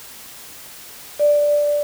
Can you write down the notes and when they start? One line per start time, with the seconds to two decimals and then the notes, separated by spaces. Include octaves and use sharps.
1.19 D5